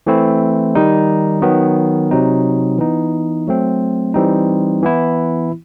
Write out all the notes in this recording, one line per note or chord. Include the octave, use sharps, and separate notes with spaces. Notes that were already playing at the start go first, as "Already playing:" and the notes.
E3 A3 C4 E4
D#3 G3 D#4
D#3 F#3 B3
C3 F#3 C4 D#4
E3 B3 D#4
F#3 A3 C4
E3 G3 C4 D#4
E3 B3 E4